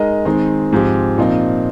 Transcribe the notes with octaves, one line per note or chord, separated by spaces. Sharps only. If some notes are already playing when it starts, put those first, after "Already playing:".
Already playing: G#3 D#4 A#4 D#5
D#3 G#3 C4 D#4
G#2 F3 C4 G4
A#2 F3 C4 D#4